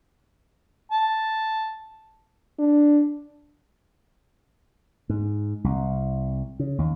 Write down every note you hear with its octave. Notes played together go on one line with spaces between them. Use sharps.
A5
D4
G#2
C2
C#3
D#2